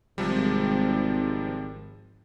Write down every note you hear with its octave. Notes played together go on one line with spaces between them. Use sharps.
G#1 C3 F3 G3